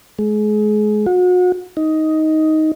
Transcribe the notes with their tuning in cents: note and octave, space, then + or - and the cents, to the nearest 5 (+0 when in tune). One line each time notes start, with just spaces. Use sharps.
G#3 +30
F#4 -35
D#4 +10